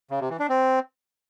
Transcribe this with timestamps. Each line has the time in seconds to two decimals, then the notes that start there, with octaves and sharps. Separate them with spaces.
0.11 C#3
0.20 C3
0.30 E3
0.40 D4
0.49 C4